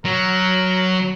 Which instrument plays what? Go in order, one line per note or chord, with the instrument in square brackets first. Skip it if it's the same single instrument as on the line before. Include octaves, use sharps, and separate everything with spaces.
[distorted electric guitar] F#3 [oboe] A#4